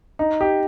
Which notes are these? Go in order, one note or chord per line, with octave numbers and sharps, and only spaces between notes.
D#4
G4